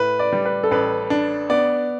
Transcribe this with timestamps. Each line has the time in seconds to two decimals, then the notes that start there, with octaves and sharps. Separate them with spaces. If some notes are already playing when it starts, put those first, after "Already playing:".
Already playing: A2 B4
0.19 D5
0.33 G3
0.45 B4
0.63 A4
0.71 A1 B4
1.10 D4
1.50 B3 D5